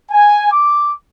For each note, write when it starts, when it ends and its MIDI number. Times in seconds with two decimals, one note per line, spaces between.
0.11 0.52 80
0.52 0.92 86